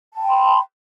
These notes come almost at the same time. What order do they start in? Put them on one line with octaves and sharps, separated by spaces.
A5 G5 B5 C6